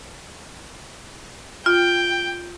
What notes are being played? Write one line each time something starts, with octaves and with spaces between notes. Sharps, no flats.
F4 G5